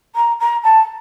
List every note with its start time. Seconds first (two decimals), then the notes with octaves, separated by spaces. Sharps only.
0.15 A#5
0.40 A#5
0.64 A5